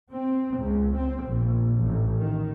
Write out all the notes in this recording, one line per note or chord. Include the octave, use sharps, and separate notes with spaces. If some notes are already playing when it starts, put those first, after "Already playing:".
C4
C#2
C4
A#1
A1
D#3